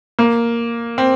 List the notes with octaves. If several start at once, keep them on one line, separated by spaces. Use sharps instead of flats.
A#3
C4